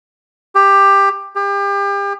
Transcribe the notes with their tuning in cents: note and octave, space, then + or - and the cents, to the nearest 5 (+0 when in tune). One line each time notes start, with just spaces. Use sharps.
G4 +15
G4 +35